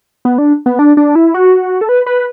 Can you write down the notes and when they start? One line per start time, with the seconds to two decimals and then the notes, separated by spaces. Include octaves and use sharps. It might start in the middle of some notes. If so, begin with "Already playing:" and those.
0.25 B3
0.38 D4
0.66 B3
0.79 D4
0.97 D4
1.15 E4
1.34 F#4
1.81 A4
1.89 B4
2.06 B4